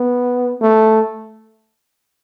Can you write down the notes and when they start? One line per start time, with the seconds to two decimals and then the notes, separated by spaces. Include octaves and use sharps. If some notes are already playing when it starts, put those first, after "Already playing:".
Already playing: B3
0.61 A3